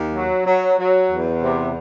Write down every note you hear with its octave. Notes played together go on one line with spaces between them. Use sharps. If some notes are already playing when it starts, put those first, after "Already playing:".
Already playing: D#2
F#3
F#3
F#3
E2
C3